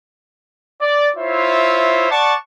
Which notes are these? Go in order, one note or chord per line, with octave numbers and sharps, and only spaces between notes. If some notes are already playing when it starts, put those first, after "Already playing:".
D5
E4 F4 C5 C#5 E5
D5 F#5 A5 C#6